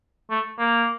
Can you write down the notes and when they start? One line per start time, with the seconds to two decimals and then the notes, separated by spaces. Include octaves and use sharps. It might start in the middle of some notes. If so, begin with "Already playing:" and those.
0.30 A3
0.59 A#3